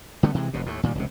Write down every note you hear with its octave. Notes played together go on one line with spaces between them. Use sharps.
D3 G3 A3 B3
C3 E3 G#3
F1 F#2 B2
D#2 A2
A#2 D#3 F3 G3
F1 C#2 C3